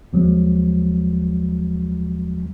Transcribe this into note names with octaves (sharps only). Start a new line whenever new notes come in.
D#2 F3 F#3 G#3